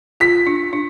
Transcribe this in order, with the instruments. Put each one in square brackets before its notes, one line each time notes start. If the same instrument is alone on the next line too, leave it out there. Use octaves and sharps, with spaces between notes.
[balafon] F4 [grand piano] B6
[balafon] D4
D4